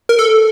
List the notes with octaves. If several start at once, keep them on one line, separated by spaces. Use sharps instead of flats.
A#4
A4